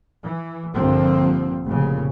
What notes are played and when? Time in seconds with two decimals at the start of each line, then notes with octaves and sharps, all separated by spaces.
0.24 E3
0.75 A#1 G2 D3 F3 A#3 C4
1.65 F1 A#2 C#3